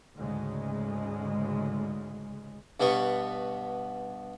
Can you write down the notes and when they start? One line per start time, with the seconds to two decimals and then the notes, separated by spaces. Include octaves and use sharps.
0.17 D2 G#2 C#3 G#3
2.80 G2 B2 B3 C#6